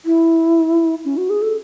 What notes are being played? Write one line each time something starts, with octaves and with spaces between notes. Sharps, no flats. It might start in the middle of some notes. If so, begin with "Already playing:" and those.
E4
C#4
F#4
G#4
A4